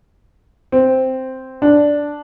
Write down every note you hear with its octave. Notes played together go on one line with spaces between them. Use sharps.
C4
D4